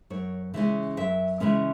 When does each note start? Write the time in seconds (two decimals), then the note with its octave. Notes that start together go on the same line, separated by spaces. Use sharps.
0.10 F#2 C#5
0.54 C#3 E3 G#3 C#4 E5
0.97 F#2 E5
1.40 C#3 E3 G#3 C#4 E5